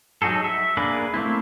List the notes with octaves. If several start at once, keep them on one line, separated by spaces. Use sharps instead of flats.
F#3 D#4 F#4 G#4 A4
E5
A#3 D4 G#4 A#4 B4
A3 A#3 C4 E4